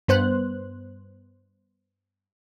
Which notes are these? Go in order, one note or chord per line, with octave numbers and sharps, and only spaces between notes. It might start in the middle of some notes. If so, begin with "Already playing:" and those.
G2 B3 C5 F#6